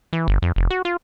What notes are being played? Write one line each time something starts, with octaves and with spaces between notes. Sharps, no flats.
E3
G1
F2
F1
F#4
F4